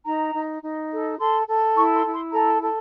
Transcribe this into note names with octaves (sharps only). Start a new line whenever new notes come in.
D#4 A#5
D#4
D#4
A4
A4 C6
A4
E4 C#6
C6
E4
C6
A4 A#5
A4